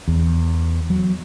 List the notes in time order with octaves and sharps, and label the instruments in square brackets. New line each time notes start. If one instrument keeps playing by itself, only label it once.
[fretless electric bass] E2
F#3